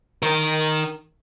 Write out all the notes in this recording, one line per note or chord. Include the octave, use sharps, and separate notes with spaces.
D#3 A#4